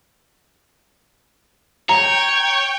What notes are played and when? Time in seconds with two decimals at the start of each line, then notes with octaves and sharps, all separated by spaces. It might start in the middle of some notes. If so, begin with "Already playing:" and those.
1.89 C#5 G5 A#5